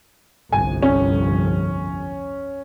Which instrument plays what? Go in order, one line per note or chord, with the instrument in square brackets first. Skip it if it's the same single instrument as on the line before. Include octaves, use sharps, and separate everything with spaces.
[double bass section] G1 C2 F2 [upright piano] G#5
[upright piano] C#4